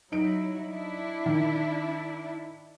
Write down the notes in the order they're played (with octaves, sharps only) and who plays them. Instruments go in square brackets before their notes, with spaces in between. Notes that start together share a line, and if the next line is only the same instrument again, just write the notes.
[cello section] F#3 E4 [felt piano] D#4 D7
[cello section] D4 E4
[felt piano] D#3